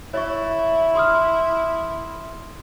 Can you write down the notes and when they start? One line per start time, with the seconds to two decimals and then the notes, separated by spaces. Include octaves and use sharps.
0.14 E4 C#5 E5 C#6
0.95 C6 D#6 F6